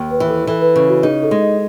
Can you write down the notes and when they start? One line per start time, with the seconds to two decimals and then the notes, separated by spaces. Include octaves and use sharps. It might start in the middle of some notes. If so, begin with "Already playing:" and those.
Already playing: D#2
0.11 B4
0.20 E3
0.29 A4
0.47 E3 A4
0.61 B4
0.76 C#3 B4
0.89 F#4
1.03 D#4 G#4
1.23 A4
1.31 G#3
1.41 D#5